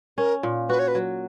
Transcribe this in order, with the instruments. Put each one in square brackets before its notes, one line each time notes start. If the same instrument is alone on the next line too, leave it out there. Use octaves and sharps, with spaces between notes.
[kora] C#4 [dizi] A#4
[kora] A#2
[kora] F#4 [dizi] B4
[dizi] C#5
B4
[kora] F#3